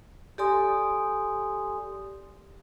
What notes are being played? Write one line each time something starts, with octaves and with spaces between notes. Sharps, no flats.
G4 A4 D5 G#5 C6 D#6